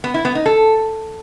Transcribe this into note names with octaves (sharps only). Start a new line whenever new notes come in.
B3
E4
B3
D#4
A4